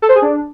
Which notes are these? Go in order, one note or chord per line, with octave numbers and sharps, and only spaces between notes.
A4
C5
G#4
D4